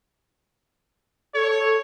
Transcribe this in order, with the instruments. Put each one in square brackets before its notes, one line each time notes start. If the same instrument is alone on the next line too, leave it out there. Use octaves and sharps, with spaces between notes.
[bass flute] A4 [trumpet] C#5